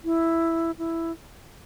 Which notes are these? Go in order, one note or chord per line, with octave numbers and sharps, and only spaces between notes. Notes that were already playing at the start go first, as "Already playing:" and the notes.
E4
E4